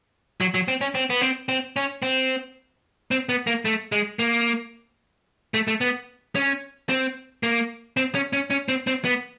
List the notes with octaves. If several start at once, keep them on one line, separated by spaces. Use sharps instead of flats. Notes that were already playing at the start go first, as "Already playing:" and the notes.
F#3
F#3
C4
C#4
C4
B3
C4
C4
C#4
C4
C4
B3
A#3
A3
G#3
A#3
A3
A3
B3
C#4
C4
A#3
C4
C#4
C#4
C#4
C4
C4
B3